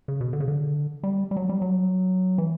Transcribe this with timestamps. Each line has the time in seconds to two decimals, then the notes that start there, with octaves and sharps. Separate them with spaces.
0.08 C#3
0.21 B2
0.33 D3
0.40 C#3
0.48 D3
1.03 G3
1.31 G3
1.37 F#3
1.49 G3
1.62 F#3
2.38 E3